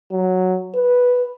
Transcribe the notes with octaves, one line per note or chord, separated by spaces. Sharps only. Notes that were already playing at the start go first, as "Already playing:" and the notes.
F#3
B4